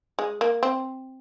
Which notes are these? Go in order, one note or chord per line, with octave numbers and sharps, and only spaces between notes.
G#3
A#3
C4